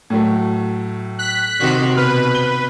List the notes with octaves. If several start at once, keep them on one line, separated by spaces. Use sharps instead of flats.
A2 F#3 A3
F#6 B6
C3 D#3 F#4
B2 B4 F6
G7